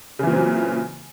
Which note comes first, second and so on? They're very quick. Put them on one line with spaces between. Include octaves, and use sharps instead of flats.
C#3 E3 A#2 C4 F#3